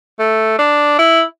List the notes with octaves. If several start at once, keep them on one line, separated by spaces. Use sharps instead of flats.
A3
D4
E4